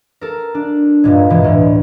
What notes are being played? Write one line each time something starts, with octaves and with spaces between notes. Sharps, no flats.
A4 A#4
D4
G2 A#2 G#3
G2 B2 E3 G#3
D2 A2